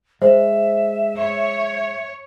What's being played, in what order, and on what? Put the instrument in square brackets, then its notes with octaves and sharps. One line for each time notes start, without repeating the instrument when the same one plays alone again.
[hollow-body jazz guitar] G#3 [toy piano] C5 [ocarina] E5
[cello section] C#5